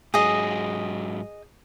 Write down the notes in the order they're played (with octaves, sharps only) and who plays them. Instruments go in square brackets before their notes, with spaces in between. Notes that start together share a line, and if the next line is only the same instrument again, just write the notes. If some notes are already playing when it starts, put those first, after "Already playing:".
[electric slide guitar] G#2 F#3 [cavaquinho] G#4 D#5